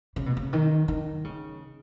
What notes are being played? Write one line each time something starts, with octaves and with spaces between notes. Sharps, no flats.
C#3
B2
C#3
D#3
D#3
C#3